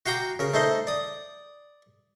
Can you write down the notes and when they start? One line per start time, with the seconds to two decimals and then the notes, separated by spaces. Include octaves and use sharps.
0.06 F#4 F5 G5 A#5 D6
0.39 C#3 A#4
0.54 A3 D#4 C5 D#5
0.87 D5 D#6